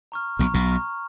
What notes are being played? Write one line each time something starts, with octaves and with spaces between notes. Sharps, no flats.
A#5 C#6 F6
B1 B2 A#5 C#6 F6
B1 B2
A#5 C#6 F6